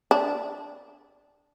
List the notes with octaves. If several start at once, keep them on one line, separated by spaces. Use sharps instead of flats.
D4